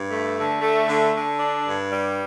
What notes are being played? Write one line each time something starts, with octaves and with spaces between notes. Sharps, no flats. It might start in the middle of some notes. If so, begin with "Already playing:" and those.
Already playing: G2
A3
D3
A3
D3
D3
D4
G2
G3